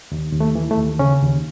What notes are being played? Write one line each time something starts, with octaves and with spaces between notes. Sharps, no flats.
D#2
D#2
A3
E3
A3
D#2
C#3 C#4
D#2